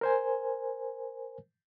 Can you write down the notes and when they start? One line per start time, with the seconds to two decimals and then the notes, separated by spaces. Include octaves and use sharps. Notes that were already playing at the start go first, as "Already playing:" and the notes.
0.01 A#4 C5 G#5